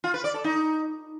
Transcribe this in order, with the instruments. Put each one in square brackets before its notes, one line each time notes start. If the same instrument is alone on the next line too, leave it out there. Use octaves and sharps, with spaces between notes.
[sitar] F4
B4
D5
A4
D#4